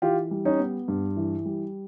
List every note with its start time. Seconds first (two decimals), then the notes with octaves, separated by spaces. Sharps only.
0.02 E3 F4 G4
0.31 G3
0.45 C#4 D#4
0.59 B3
0.88 G2
1.17 E3
1.45 G3